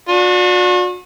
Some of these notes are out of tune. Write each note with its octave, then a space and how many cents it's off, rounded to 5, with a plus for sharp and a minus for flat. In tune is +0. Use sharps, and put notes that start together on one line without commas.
D4 +0 F#4 -40